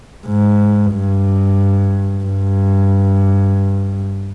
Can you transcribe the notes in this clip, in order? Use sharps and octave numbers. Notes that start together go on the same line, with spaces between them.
G#2
G2
G2